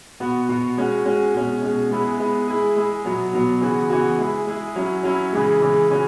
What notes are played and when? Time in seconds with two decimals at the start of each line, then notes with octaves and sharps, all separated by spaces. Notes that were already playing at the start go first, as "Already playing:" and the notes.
0.20 B2 B3 F#4
0.49 B2 B3 F#4
0.77 G#3 C#4 F#4
1.05 G#3 C#4 F#4
1.34 B2 G#3 C#4
1.62 B2 G#3 C#4
1.91 G#3 B3 E4 G#4
2.20 G#3 B3 E4 G#4
2.48 G#3 E4 G#4
2.76 G#3 E4 G#4
3.05 B2 F#3 B3
3.33 B2 F#3 B3
3.61 C#3 E3 B3 F#4
3.90 C#3 E3 B3 F#4
4.19 G#3 E4 G#4
4.47 G#3 E4 G#4
4.76 F#3 C#4 E4
5.04 F#3 C#4 E4
5.33 C#3 E3 G#3
5.61 C#3 E3 G#3
5.90 C#3 E3 C#4 F#4